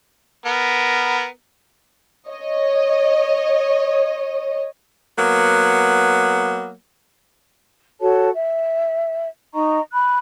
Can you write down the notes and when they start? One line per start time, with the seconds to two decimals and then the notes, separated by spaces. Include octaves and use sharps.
0.46 B3 A#4
2.29 C#5 D#5
5.17 F#3 A#3 B3
8.00 F#4 A4 C#5 A5
8.33 E5
9.54 D#4 D#5 A#5 C#6
9.93 B5 F#6